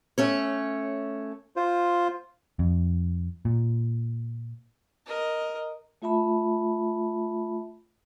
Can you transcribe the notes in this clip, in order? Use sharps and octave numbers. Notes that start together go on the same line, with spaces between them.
A3 C#4 C#5
F4 C5
F2
A#2
A#4 D#5
A3 F4 E5 A5 B5